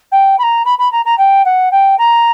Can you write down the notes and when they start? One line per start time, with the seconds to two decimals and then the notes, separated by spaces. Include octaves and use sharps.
0.11 G5
0.38 B5
0.43 A#5
0.65 B5
0.78 B5
0.91 A#5
1.05 A#5
1.18 G5
1.45 F#5
1.71 G5
1.98 A#5